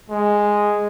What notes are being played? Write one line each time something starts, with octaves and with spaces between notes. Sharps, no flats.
G#3